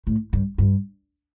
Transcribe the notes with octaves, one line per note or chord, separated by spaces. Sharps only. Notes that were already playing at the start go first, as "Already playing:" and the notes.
A2
G2
G2